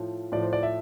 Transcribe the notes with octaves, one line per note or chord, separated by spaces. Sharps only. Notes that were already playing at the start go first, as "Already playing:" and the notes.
Already playing: A2 F3
A2 F3 D5
C5
D5
E5